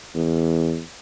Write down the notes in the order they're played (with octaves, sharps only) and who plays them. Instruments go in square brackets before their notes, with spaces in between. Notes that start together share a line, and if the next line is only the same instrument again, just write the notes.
[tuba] E2